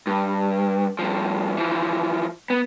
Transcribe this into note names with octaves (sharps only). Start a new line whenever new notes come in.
G2
G2 F3
E3 F3
B3